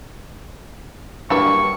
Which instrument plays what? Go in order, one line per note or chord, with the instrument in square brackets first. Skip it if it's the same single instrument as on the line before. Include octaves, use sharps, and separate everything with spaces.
[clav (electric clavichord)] G2 F#3 A#3 [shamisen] D4 E4 B4 [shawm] C#6